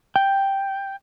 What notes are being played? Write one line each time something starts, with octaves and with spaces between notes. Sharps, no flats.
G5